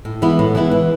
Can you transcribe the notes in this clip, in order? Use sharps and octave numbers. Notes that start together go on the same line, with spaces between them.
A2
E3 G#3 B3 E4
A2
E3 G#3 B3 E4
E3